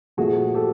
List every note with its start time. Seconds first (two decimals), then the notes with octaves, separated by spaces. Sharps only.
0.17 A#2 F3 A3 C4 F#4 G#4
0.54 G4 A4